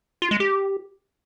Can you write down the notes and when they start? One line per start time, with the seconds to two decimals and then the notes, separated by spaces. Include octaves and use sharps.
0.22 F4
0.31 G#3
0.40 G4